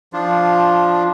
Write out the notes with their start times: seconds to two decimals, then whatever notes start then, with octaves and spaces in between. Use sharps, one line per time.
0.13 F3 D4 F4